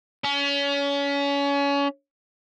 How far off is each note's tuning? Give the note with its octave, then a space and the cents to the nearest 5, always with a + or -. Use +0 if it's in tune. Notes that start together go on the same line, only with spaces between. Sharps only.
C#4 +30